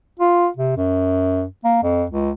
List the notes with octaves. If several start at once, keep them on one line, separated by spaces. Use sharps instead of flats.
F4
C3
F#2
A#3
F2
C#2